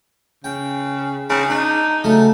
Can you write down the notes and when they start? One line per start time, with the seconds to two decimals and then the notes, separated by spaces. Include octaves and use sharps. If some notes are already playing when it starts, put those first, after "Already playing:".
0.44 C#3 G5
1.30 C#3 D#4
1.50 D4 D#4
2.04 C#3 F#3 A3